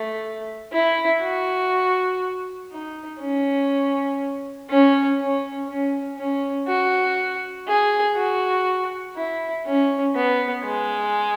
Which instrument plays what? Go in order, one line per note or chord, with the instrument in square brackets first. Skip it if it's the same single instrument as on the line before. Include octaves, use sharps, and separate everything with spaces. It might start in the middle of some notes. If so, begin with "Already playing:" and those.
Already playing: [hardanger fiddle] A3
E4
F#4
D#4
C#4
C#4
C#4
C#4
C#4
F#4
G#4
F#4
E4
C#4
B3
G#3